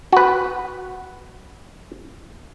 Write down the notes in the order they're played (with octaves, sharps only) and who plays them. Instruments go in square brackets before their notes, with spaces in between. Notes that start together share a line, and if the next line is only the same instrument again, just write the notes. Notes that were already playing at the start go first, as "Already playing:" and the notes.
[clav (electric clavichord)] F#4 B4